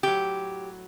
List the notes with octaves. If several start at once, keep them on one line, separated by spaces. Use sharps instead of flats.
A2 F#3 G4